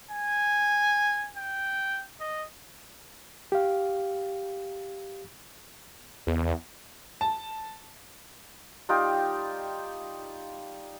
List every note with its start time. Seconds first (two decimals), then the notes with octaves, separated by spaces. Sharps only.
0.11 G#5
1.37 G5
2.20 D#5
3.52 G4 F5
6.27 E2
7.21 A5
8.89 G3 D#4 F4 G5